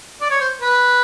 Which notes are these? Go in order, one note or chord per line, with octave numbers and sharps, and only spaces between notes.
D5
C#5
C5
B4